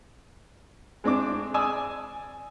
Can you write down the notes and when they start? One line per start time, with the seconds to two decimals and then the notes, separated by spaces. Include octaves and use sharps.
1.04 G#3 C4 D4 D6
1.54 D5 G#5 D#6 E6